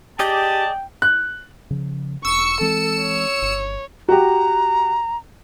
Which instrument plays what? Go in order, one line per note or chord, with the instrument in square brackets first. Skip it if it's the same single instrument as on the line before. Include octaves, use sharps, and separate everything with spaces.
[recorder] G4 [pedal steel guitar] G#4 D5 D#5 [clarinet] G5 [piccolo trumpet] A5
[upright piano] F#6
[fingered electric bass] C#3 F3
[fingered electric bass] E1 [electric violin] C#6 [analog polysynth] E6 C#7
[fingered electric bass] E3 G#3 C4 [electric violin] A4
[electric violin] C#5
[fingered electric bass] G1
[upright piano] F#4 G4 [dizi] A#5